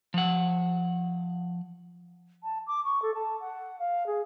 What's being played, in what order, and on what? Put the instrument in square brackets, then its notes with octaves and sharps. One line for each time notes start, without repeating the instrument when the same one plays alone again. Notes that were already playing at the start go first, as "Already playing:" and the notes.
[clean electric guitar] F3 F#5
[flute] A5
D6
C#6
A4
A5
F#5
F5
G#4